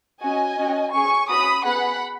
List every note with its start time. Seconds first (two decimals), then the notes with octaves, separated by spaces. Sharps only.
0.21 C#4 F#4 D#5 G#5
0.58 C#4 F#4
0.94 C#4 G#4 G#5 C#6
1.29 C#4 F#4 B5 D#6
1.65 B3 G#4 F#5 B5